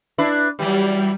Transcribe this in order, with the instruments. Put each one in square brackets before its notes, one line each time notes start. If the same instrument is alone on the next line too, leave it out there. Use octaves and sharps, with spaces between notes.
[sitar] D4 E4 B4
[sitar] E3 F#3 [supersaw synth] G3